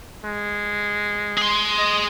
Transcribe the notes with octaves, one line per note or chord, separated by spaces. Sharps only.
G#3
G#4 C6
D#5